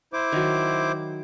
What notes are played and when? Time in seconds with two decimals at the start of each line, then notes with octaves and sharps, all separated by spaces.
0.13 E4 C5 D6
0.32 D#3 F#3